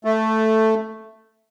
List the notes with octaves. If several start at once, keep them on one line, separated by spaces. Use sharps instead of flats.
A3